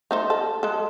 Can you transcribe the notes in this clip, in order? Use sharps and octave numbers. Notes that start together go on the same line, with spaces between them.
A3 D#4 C5
A4
G#3 A4